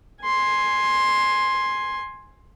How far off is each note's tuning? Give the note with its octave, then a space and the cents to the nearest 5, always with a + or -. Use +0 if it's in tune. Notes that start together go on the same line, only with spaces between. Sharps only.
G#5 +0 C6 +10